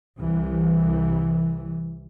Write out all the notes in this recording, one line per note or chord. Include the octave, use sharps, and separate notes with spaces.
C2 E3